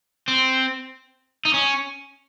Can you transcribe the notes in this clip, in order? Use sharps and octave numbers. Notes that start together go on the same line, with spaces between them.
C4
D#4
C#4